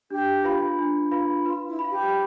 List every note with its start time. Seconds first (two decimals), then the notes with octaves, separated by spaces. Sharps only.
0.10 D4 G4
0.44 F4 B4 F5 B5
0.79 D4
1.11 F4 B4 F5 B5
1.46 F4 B4
1.68 E4
1.79 B5
1.84 F5
1.90 G4